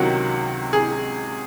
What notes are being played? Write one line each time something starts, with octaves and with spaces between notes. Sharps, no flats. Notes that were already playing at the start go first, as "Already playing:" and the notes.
Already playing: C#2 C3 D#3 F#3 F#4
G#4